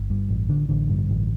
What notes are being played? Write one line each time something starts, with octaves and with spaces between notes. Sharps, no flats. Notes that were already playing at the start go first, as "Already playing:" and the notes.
Already playing: G1
G2
A1
D3
A1 D3
G2
A1